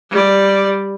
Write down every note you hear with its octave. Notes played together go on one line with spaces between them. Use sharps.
G3 D5